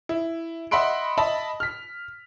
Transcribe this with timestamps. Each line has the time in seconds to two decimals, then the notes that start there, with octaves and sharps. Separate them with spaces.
0.09 E4
0.71 D#5 E5 F#5 B5 C6 D7
1.18 D#5 E5 A5 B5
1.60 F6 B6